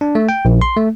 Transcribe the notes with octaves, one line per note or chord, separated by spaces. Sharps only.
D4
A3
G5
A#1
C6
A3